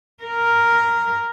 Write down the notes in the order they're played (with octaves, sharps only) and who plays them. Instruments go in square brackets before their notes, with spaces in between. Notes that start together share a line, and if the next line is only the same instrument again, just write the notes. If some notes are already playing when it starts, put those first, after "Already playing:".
[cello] A#4